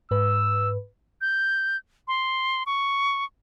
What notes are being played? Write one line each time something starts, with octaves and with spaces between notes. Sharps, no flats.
G#2 B4 E6
G6
C6
C#6